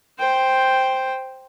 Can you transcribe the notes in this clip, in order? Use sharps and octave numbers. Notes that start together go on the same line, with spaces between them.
C5 G5